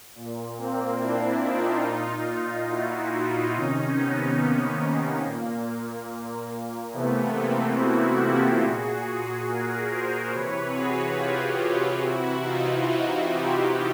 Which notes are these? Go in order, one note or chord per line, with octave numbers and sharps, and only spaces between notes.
A#2
A#3 C4
D4 E4
D#4 F4
A#2
E4 F#4
D#4 F4
C3 D#3 C#4 D#4
B3 C#4
A#3
A#2
C3 E3 A3 B3
A#3 C4
E4 F#4
F4 G4
A#2 F#4 G#4
G#4 A#4
A#4 C5
C3 E3 B4 C#5
F#4 G#4
F4 G4
C3 E3 E4 F#4
D#4 F4
E4 F#4
F4 G4